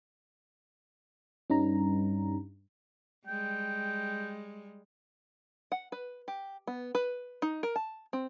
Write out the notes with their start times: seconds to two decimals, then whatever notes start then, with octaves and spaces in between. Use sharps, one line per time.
1.50 G2 C#4 D#4 A#5
3.27 G3 G#3 G5
5.72 F#5
5.92 B4
6.28 G4
6.67 B3
6.95 B4
7.42 D#4
7.63 A#4
7.76 A5
8.13 C4